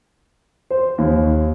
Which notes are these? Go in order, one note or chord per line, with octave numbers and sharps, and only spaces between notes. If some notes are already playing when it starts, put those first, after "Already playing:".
C5
D#2